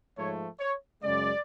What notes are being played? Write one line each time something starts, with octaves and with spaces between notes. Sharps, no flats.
G#2 F3 A3 C#5
C#5
F#2 C#3 G#3 D5